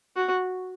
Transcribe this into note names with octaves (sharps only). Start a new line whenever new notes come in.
F#4